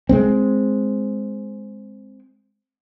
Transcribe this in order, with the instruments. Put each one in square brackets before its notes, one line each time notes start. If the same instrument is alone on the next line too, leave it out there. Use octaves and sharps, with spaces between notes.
[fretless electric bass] G#3 B3 C4